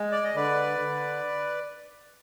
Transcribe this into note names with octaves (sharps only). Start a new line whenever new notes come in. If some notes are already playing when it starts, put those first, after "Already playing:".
Already playing: G#3
D5
D#5
D3 B4 D5
D3